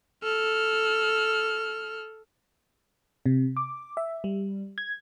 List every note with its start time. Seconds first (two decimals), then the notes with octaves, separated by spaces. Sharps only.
0.24 A4 F6
3.26 C3
3.57 D6
3.97 E5
4.24 G3
4.78 G#6